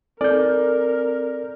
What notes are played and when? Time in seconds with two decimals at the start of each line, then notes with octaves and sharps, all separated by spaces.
0.21 C4 A4 A#4 D5 G6